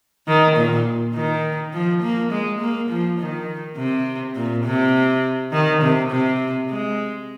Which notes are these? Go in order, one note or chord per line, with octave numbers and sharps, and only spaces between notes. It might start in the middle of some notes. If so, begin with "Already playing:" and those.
D#3
A#2
D#3
F3
A#3
G#3
A#3
F3
D#3
C3
A#2
C3
D#3
C3
C3
G#3